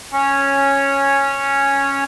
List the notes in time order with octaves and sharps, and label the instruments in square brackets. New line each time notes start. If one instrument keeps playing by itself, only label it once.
[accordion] C#4 C#5